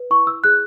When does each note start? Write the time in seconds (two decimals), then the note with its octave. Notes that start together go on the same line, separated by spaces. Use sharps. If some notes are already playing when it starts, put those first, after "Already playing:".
Already playing: B4
0.11 E4 C#6
0.27 E4 E6
0.44 G#4 F#6